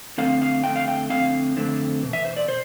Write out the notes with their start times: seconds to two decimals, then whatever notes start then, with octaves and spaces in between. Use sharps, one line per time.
0.18 F2 D3 A3 C4 F5
0.42 F5
0.64 F2 D3 A3 C4 G5
0.76 F5
0.88 G5
1.10 F2 D3 A3 C4 F5
1.56 F2 D3 A3 C4
2.02 E2 B2
2.13 E5
2.25 C5
2.36 D5
2.48 C5